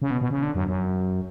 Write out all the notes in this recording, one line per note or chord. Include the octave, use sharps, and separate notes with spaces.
C#3
B2
B2
C#3
D3
F#2
F#2